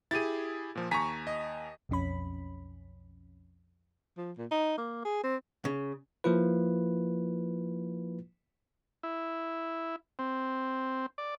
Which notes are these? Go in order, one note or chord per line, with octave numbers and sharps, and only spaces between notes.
E4 G4 G#4 A6 D#7
A#2 F3
D#2 G#5 A#5 C#6 B6
D#5
B1 F2 C#4 B5
F3
A#2
D#4
A#3
G#4
C4
C#3
F3 A#3 E4 F4 B4
E4
C4
D5